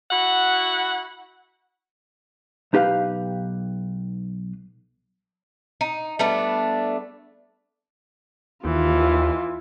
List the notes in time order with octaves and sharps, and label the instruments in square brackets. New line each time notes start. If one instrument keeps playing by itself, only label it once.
[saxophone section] E4 F#4 F#5
[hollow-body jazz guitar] B1 D#4 G4 B4 F5
[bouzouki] D#4
G3 A3 B3 D4
[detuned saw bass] D#2 [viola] E3 [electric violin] F4